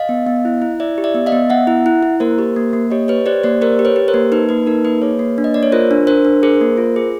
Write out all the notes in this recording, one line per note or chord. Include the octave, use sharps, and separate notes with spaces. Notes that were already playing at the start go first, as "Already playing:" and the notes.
Already playing: D#5 F5
B3
B3
E4
E4
E4 D5 E5
G4
D5 E5
B3
D#5 F5
B3
B3 E5 F#5
E4
E4
E4
A#3 A#4 C5
G4
A#3
A#3
G4 C#5 D#5
G4 B4 C#5
G4 C5 D5
A#3 C5 D5
G4 A#4 C5
G4
B4 C#5
G4
A#4 C5
A#3
D#4 B4
A#3 B4
D#4 A#4
A#3 B4
G#4 B4 C#5
A#3
D4
D#5
A#3 D5
C#5
F4 A#4 C5
D4
D4 A#4 C5
D4
G#4 A#4 C5
A#3
F4
G#4